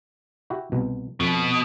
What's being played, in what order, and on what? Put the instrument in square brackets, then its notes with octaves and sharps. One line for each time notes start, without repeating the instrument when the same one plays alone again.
[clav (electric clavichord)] E4 F#4 G4
C2 B2
[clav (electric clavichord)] F2 [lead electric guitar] B2